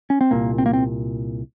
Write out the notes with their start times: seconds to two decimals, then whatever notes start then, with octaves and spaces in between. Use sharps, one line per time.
0.10 C#4
0.21 C4
0.31 C2 A#2 A#3
0.58 C4
0.66 A#3
0.73 C4